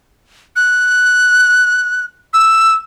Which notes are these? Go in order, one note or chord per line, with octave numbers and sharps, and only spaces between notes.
F#6
E6